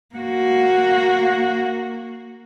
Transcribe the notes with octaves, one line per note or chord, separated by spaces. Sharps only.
A#3 F#4